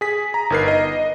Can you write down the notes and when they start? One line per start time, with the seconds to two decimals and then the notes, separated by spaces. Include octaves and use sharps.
0.01 G#4 B6
0.34 A#5
0.50 G1 D#4 A#4 B4 C7
0.68 D#5